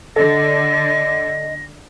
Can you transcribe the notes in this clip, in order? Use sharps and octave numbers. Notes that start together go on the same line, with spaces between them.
D3 A4 D#5 A#6